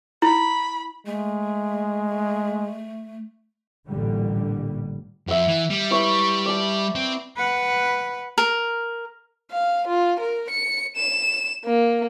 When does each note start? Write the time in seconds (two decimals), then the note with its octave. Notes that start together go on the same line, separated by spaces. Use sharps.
0.22 E4 B5
1.06 G#3 A3
3.87 A1 A#2 D3 G3
5.28 F2 E5 F#5
5.48 E3
5.70 G3
5.91 E4 B4 C#5
6.46 D5 A5
6.95 C4
7.37 B4 F#5
8.38 A#4
9.52 F5
9.88 F4
10.20 A#4
10.50 C#7
10.96 E7
11.65 A#3